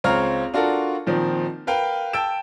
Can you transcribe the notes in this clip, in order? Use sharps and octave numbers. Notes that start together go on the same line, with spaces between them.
C#2 C4 C#5 F5 A#5 F6
D4 F4 F#4 A4 A#4
A#2 D#3 F3 C4
A#4 B4 F5 G5
G5 A5 E6 A6 D7 E7